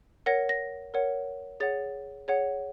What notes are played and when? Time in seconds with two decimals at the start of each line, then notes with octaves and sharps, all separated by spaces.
0.26 A#4 C#5 F#5 A#6
0.49 A#6
0.94 A#4 C#5 F#5
1.60 G#4 C#5 F#5 A6
2.28 G#4 C#5 F#5